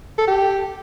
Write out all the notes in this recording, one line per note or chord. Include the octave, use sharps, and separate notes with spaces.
A4
G4